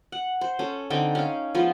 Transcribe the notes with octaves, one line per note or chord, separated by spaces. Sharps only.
F#5
C5
C#4 A4
D3 C4 D#4 G5
C#4 F5
F3 G#3 B3 F4